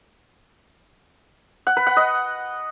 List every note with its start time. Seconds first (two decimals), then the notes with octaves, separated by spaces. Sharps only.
1.67 F#5
1.77 B4
1.87 F#5
1.97 D#5